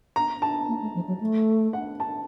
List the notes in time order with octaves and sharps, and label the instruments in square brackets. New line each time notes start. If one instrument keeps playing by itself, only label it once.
[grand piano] A#5
A5
[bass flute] A#3
A3
F3
F#3
A3
[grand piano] F#5
A5